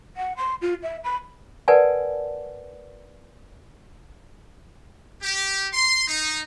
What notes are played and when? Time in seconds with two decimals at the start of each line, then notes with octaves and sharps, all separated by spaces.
0.17 F#5
0.37 C6
0.62 F4
0.83 E5
1.04 B5
1.68 A#4 B4 D5 F#5 G#5 A5
5.22 G4
5.73 C6
6.08 D#4